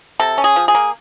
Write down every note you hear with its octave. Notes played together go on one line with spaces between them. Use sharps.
C3 A4
C#4
G#4
F3
G#4
A#3